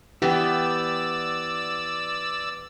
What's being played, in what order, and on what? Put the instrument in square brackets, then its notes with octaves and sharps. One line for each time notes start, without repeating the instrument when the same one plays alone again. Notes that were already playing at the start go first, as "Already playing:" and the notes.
[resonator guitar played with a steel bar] E3 B3 [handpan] G4 [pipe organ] D5 E6